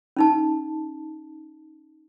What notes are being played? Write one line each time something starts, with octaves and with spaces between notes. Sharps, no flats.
C#4 D#4 A5